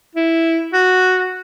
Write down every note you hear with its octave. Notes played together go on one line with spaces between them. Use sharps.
E4
F#4